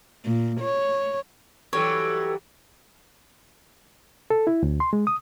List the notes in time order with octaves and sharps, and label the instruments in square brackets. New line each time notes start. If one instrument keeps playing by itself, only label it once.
[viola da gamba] A#2
C#5
[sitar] E3 F#3 G3 [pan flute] A4 [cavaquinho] C#5
[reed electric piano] A4
E4
D2
C6
G#3
D#6